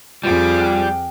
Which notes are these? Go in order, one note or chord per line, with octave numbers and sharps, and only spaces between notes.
F2 G3 F4 G#4 A5 D6
G5 F6 F#6